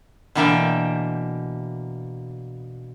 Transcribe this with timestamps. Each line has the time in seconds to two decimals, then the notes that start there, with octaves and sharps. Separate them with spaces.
0.35 B2 D3 E3 A#3 E5 G5